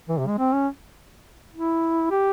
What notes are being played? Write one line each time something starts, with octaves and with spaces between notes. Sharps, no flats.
E3
C3
G#3
C4
C#4
E4
G4